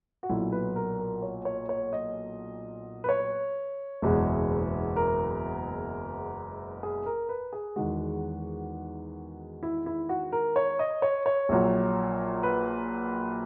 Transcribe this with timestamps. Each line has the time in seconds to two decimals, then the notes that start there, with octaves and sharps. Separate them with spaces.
0.23 F#4
0.29 B1 A#2 F#3 E4
0.52 B4
0.76 A#4
0.99 A#4
1.22 C#5
1.45 C#5
1.69 C#5
1.93 D#5
3.04 B4
3.09 C#5
4.02 F#1 E2 B2 G#3
4.96 A#4
6.83 G#4
7.06 A#4
7.29 B4
7.53 G#4
7.76 E2 D#3 G#3 F#4
9.63 E4
9.86 E4
10.09 F#4
10.32 A#4
10.56 C#5
10.79 D#5
11.02 C#5
11.26 C#5
11.49 A#1 A#2 F#3
12.43 B4